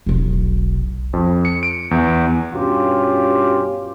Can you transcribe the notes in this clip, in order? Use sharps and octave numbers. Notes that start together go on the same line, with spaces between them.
E1 B1
F2
C#7
D7
E2
G2 B2 C#4 F4 G4